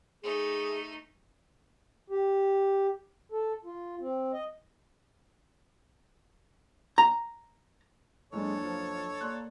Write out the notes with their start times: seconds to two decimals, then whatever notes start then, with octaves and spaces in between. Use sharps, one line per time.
0.23 A3 D#4 G#4
2.10 G4
3.32 A4
3.65 F4
4.01 C4
4.33 D#5
6.98 A#5
8.33 F#1 G#3 D4 A4 C#5
8.62 F3
9.21 A#3 D5 C6 F#6